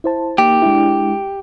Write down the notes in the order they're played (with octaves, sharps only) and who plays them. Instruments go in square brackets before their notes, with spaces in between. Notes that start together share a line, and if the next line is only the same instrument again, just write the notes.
[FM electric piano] E4 C5 A5
[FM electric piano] A#3 D#4 [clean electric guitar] G4
[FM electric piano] G#3 D4 E4